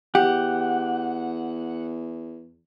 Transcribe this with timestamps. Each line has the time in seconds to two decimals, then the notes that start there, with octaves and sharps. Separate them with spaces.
0.15 E2 G4 F#5